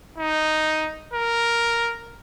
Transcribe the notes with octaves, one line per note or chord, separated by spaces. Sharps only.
D#4
A#4